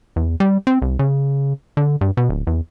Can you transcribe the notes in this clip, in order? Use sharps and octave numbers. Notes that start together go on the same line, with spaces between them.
E2
G3
C4
C2
C#3
D3
G2
B2
D1
E2